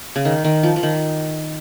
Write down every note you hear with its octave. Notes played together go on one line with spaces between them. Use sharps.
C#3
D#3
D#3
F3
F3
D#3